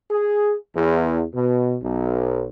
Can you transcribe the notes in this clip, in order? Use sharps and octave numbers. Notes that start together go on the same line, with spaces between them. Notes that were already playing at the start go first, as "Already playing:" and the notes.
G#4
E2
B2
B1